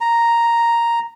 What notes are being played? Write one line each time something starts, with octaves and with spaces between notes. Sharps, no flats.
A#5